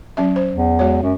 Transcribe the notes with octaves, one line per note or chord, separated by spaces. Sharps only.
F#3 C#4 E5
C5
E2
G#3 F#4 C#5
F#2